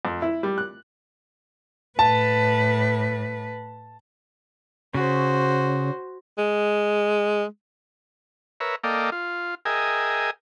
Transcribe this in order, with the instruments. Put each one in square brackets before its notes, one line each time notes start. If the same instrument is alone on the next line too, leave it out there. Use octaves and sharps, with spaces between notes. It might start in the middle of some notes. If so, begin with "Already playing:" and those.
[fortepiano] F2
E4
G3
F#6
[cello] A2 B4 [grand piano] A5
[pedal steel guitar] C#3 [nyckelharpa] F#4 C5
[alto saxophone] G#3
[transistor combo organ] A#4 B4 C#5 E5
A#3 A4 D5 D#5 F5 G5
F4
G#4 A#4 D#5 E5 G5 G#5